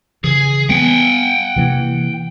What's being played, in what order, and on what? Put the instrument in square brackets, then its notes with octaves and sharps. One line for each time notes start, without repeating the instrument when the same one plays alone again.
[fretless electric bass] C#3 E3 [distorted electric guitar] G#4
[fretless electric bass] G3 B3 [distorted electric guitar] F#5 G5
[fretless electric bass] C3 E3 A#3